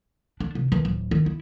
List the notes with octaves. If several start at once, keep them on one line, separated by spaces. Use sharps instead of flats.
D4
C3
D#3 E3
D1
D#3
E4